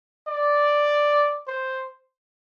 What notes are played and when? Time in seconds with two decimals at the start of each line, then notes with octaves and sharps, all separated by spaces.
0.28 D5
1.47 C5